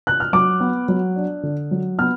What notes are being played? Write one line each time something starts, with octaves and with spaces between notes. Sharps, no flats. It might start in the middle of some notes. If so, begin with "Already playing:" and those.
F#6
F6
F#3 D6
B3
F#3
D4
D3
F#3
B3 F6